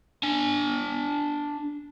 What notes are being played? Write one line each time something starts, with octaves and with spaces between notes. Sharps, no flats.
D4 G#5